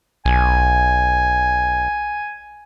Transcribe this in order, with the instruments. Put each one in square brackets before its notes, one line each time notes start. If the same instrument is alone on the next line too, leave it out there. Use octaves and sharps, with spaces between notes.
[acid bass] B1 [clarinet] G#5